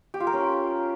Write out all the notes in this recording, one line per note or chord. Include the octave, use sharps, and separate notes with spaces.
G4
F4
A#4
C#4